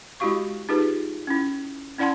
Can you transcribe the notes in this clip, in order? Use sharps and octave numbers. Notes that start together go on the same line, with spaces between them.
G#3 E4 F#4 G4 F5 C#6
D#4 F4 G4 G#4 B4
C#4 E4
C#4 E4 D5 F#5 A5 C6